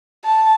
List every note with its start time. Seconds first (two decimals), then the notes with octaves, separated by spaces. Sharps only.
0.25 A5